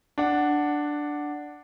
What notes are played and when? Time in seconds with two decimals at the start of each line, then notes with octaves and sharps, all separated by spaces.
0.18 D4 F#5